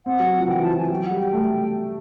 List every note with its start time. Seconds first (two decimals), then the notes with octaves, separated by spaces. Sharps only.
0.06 C4 F#5
0.20 F#3
0.39 F3
0.48 E3 G5
0.62 F3 A5
0.76 F3 G#5
0.90 F#3 G5
1.04 F#5
1.11 G3
1.17 G5
1.33 A3